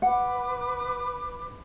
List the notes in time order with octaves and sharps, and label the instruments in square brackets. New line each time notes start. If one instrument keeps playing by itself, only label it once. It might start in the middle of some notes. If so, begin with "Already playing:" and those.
[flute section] B4 D6 [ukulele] F#5